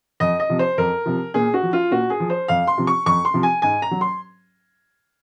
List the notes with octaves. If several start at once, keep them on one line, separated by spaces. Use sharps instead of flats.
F2 D#5
D#5
C3 F3
C5
F2 A#4
C3 F3
A#2 G#4
F#4
F3
F4
A#2 F#4
G#4
F3
C5
F2 F5
C6
C3 F3
C#6
F2 C#6
C6
C3 F3
G#5
G#2 G#5
A#5
F#3
C6